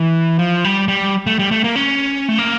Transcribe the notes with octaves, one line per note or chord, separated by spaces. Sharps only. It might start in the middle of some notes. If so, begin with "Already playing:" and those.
Already playing: E3
F3
G3
G3
A3
G3
A3
A#3
C#4
A3
A#3